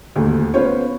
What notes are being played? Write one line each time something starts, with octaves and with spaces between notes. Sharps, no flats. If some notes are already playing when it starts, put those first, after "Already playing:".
D#1 D2
B3 C#4 F4 C5 C#5